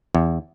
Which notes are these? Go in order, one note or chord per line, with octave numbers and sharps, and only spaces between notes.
E2